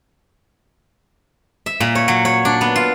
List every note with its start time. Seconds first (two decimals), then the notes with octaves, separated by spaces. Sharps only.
1.66 E5
1.80 A#2
1.95 C#5
2.08 F#3
2.25 C#5
2.45 D4
2.61 B3
2.76 F4